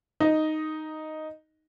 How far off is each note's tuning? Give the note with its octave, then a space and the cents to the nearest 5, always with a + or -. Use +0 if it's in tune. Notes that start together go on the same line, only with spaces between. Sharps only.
D#4 +0 D#5 +0